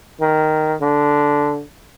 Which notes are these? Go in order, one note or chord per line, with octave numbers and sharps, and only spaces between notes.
D#3
D3